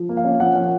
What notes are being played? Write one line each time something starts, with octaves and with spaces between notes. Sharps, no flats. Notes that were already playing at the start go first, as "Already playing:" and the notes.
Already playing: F3
A#3
F5
C#4
F3 F#5
C#4